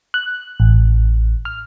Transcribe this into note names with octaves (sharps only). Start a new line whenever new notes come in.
F#6
A1
F6